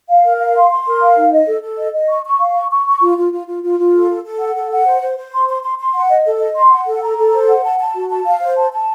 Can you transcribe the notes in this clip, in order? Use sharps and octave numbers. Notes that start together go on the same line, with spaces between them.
F5
A#4
F5
C6
C6
A#4
F5
D#4
D#5
A4
A4
D#5
D#5
C#6
C#6
F5
C#6
C#6
C#6
F4
F4
F4
F4
F4
F4
A4
A4
A4
F#5
A4
F#5
C5
C5
C5
C6
C6
C6
C6
F#5
D#5
A4
D#5
C6
F#5
A4
A#5
A4
C5
F#5
A5
A5
F#4
A5
F5
C5
A5
A5